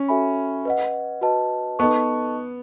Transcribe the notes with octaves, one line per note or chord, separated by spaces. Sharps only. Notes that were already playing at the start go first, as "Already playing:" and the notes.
Already playing: C#4
F#4 A4 E5 G#5 B5
B4 D#5 F#5
F#4 B4 D#5 A5
B3 D#4 A4 D#5 A5 C#6